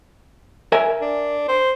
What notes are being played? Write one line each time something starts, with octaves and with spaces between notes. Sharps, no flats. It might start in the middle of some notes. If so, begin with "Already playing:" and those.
A#4 E5 G#5
D4
C5